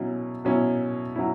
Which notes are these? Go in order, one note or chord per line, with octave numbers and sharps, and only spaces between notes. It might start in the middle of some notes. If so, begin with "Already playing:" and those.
Already playing: B2 F#3 C#4 E4
B2 F#3 C#4 E4
F#3 C#4 E4